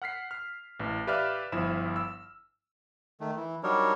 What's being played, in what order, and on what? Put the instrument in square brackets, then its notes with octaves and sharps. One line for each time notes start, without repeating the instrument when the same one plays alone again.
[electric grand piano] F#5 F6 B6 C7
F6
A1 E3
G4 B4 D5 E5 F5 F6
G1 F3 E4 B5 E7
E6
[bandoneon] D#3 A3
E3
F#3 G3 D4 D#4 A#4 C#5